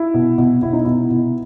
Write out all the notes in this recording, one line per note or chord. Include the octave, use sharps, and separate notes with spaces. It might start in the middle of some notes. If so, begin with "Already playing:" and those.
Already playing: E4
B2
B2
B2 E4
D#4
B2 E4
B2